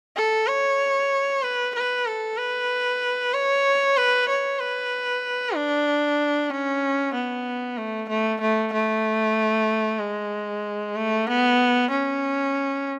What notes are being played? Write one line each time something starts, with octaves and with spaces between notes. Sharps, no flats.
A4
C#5
B4
B4
A4
B4
C#5
B4
C#5
B4
D4
C#4
B3
A3
A3
A3
A3
G#3
A3
B3
C#4